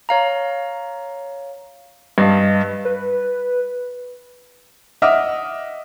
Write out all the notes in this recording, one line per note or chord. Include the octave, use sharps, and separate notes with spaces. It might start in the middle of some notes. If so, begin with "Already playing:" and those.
C#5 F5 A#5
G2 B4 D#5 F5
B4
D#5 E5 F#5 D6 D#6 F6